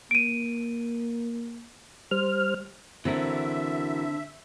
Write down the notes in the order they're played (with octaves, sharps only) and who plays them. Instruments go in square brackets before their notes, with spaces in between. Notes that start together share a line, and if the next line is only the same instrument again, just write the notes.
[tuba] A#3 [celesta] D7 D#7
[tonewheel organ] G3 C5 F6
[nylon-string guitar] D3 C4 [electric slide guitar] E3 F#4 A#4 [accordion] E5